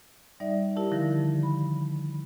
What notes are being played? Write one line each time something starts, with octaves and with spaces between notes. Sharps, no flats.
G3 D#4 D5 E5
D#4 E4 G4 A#4 A5
D3 D#3 F3 A#6
B5